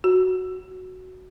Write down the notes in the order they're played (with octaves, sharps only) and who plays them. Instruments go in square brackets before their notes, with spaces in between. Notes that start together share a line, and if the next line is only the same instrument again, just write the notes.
[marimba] F#4